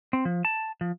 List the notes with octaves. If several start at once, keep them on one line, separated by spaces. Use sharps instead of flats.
C4
F3
A5
F3